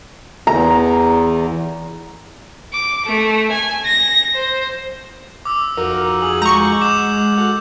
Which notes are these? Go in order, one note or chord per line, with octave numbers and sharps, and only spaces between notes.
E2 A#5
D6
A3
G#5
A#6
C5
D6 E6
F2 D#4 F#4 A#4
G#4 F#7
G#3 A#5 C#6 G6
F#5 D6 E7
F#4 A4 F#5